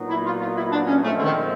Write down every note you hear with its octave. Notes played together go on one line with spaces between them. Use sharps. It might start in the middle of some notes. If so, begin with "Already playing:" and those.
Already playing: A#2 F#3 B3 D#4
E4
F4
F4
E4
D4
C#4
A#2 F3 G#3 A3 C4
D3
D#3